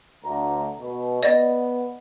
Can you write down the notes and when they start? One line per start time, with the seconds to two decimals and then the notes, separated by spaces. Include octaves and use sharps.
0.24 D2 A#5
0.79 B2
1.23 B3 D5 D#5